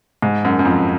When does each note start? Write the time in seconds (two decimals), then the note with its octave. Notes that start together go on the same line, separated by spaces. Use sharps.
0.22 G#2
0.45 F#2
0.59 F#2
0.65 F2